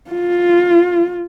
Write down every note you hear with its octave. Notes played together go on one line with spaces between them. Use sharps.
F4